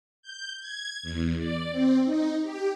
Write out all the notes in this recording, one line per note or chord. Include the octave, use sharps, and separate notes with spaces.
G6
G#6
E2
D5
C4
D#4
G4